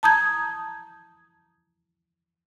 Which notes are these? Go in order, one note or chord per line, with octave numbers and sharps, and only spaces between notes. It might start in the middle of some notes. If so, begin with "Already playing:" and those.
A5 A#5 D#6 G6 G#6